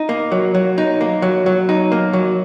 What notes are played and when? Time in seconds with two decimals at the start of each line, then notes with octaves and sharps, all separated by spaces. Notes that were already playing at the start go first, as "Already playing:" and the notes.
Already playing: D#4
0.09 A#3
0.32 F#3
0.55 F#3
0.78 D#4
1.01 A#3
1.22 F#3
1.46 F#3
1.69 D#4
1.92 A#3
2.13 F#3